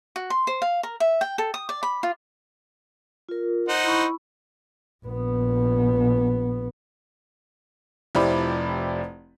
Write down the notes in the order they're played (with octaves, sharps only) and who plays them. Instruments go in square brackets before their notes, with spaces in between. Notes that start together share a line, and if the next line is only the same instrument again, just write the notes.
[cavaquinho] F#4
C6
C5
F5
A#4
E5
G5
A4
D#6
D5
B5
F4
[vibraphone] F4 A#4
[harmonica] D#4 C5 F#5
[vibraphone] E4 B5 C#6
[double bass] A#1 B3
[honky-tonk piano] F1 F3 E4 G4 D5 B5